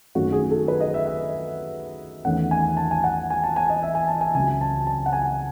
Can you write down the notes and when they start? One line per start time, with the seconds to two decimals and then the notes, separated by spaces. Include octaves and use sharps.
0.15 F#2 D#3 A3 C#4 F#4
0.33 G#4
0.51 A4
0.68 B4
0.81 D#5
0.94 E5
1.07 E5
2.25 E2 D#3 A3 C#4 F#5
2.51 G#5
2.77 A5
2.91 G#5
3.04 F#5
3.30 G#5
3.43 A5
3.56 G#5
3.70 D#5
3.83 E5
3.95 G#5
4.08 A5
4.21 G#5
4.35 C#2 C#3 F#3 G#5
4.61 A5
4.87 A5
5.06 F#5
5.13 G#5